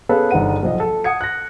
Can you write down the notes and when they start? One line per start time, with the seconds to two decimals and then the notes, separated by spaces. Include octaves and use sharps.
0.09 B3 C#4 G#4 A4 B4 F5
0.31 G1 D#4 C5 F#5 D#7
0.63 B1 F3 D#5
0.80 A4
1.04 F#5 D#6 G#6 C#7
1.21 F#6 A#6